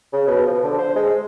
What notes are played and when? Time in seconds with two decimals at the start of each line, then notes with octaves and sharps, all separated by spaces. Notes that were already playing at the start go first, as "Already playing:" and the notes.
0.13 C#3
0.27 B2
0.46 F3
0.63 D3
0.78 C5
0.96 G#3